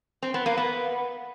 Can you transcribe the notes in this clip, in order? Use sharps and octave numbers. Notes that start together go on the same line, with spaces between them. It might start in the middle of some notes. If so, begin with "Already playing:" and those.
C4
B3
A#3
B3